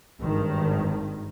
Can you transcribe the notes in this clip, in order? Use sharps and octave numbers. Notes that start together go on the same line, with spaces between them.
G#1 G2 D#3